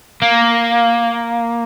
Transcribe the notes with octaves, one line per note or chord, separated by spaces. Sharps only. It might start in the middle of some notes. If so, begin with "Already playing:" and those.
A#3